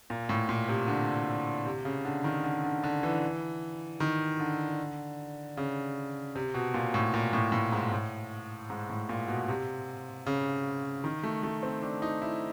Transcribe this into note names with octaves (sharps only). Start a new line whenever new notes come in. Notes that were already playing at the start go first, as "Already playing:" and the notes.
A#2
A2
A#2
C3
D3
C3
C#3
D3
D#3
D3
D3
D3
E3
D#3
D3
C#3
C3
B2
A#2
A2
A#2
A2
A2
G#2
A2
G#2
A2
A#2
B2
C3
C#3
D#3
A3
A3
C4
D4
D#4
E4